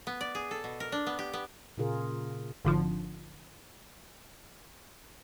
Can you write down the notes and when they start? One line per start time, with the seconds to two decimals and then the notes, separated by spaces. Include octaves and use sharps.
0.07 B3
0.21 D5
0.35 G#4
0.51 A4
0.64 B2
0.80 A#4
0.92 D4
1.07 B3
1.19 G4
1.33 B3
1.78 A#2 C#3 F4 G#4 A#4
2.65 G#1 D3 F3